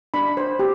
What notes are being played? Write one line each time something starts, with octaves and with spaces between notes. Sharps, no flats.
D4 B5
C5
G4